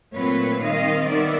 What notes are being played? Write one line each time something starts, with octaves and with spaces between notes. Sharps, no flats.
A#2 F#3 A3 C4 B4 C#5
D#3 G3 C4 D#5 F5
D#3 G3 B3 D5 E5